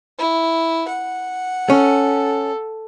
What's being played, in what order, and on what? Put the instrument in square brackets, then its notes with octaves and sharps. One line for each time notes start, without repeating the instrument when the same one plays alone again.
[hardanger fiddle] E4
F#5
[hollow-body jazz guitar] C#4 [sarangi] A4